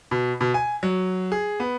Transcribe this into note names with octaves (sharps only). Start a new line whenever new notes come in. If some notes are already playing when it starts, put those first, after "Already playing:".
B2
B2
G#5
F#3
G#4
B3